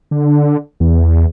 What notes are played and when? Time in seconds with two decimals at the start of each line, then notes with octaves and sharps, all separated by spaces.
0.11 D3
0.80 E2